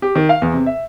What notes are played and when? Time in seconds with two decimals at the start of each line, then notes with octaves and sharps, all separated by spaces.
0.02 G4
0.15 D#3
0.29 F5
0.42 E2
0.54 C3
0.66 E5